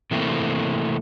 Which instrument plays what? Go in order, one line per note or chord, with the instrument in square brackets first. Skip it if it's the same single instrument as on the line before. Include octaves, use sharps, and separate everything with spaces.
[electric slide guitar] C3 E3 A3 A#3 C4